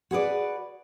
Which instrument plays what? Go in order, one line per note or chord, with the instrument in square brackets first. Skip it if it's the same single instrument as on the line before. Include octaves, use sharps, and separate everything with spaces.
[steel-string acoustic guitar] F#4 G#4 B4 D5